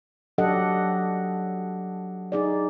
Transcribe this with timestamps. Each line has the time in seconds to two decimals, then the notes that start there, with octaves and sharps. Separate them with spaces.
0.38 F#3 D4 G4 A4 D#5 F#5
2.32 D#4 G#4 D5